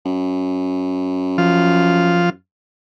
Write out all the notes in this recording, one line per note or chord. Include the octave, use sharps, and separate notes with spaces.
F#2
F3 F4